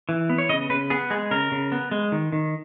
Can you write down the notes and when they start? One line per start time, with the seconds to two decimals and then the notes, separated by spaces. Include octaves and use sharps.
0.09 E3
0.30 B3
0.38 C#5
0.49 C#3 D#5
0.70 C#3 B4
0.90 B3 G#4
1.10 G#3 G#4
1.31 C#3 A#4
1.52 C#3
1.72 B3
1.91 G#3
2.12 D#3
2.33 D#3